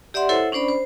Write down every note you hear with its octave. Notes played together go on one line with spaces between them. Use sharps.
G4 D5 E5 F#5 C6
E4 A4 C5 C#5 E5 F#5
C#4 D4 C5 D5 B5
C5